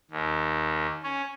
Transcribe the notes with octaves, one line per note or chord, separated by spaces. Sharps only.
D#2
C#4